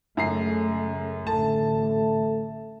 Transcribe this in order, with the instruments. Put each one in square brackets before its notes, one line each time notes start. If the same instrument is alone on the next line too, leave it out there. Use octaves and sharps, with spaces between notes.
[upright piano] F#2 A#5 C7 [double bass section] C#3 G#3 A3
[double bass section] A1 D3 [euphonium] A3 [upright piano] A5